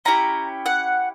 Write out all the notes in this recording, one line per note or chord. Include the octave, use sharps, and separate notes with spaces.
C#4 E4 G4 A#5
F#5